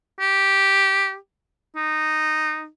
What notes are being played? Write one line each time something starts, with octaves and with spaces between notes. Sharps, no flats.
G4
D#4